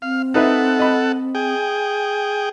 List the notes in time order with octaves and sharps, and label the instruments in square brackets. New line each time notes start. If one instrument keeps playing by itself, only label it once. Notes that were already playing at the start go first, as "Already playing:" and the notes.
[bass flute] C4 [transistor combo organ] F5
[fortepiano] D#4 B4 E5 [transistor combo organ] A4 F#5
[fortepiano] D#5 B5
[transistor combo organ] G#4 G5